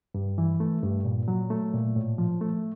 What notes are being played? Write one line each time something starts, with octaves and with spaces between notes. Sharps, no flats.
G2
E3
A3
G2
A#2
F#3
A3
A#2
A2
F3
A3